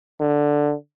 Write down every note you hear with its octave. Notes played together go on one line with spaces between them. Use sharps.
D3